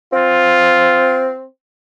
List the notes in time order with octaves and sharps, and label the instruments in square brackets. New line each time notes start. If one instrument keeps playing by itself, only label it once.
[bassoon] C4 [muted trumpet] F4